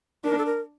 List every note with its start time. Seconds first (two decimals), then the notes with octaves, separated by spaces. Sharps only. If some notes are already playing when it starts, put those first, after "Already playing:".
0.24 D4 A#4
0.38 A4
0.46 A#4